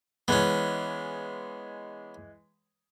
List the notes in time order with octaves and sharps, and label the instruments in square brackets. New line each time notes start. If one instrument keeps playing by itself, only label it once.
[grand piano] E3 G#3 [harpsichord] B3 C#4